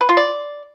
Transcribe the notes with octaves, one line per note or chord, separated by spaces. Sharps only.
B4
F4
D5